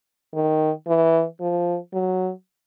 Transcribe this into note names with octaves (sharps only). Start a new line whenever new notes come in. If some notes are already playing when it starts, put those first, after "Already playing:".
D#3
E3
F3
F#3